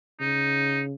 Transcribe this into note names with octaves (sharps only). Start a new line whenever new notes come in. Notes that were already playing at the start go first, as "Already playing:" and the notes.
C#3 D#4